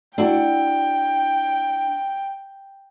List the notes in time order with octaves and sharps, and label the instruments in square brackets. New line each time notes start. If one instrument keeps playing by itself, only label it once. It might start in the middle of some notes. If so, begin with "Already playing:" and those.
[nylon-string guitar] D4 E4 F#4 [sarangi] G5